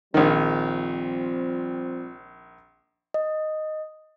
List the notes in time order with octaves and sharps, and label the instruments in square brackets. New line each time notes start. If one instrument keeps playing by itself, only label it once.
[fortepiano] A#1 D#3 [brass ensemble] F3 G3 C4
[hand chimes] D#5